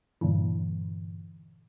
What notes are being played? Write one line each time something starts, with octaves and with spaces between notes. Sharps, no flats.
G2 A#2 D3 E3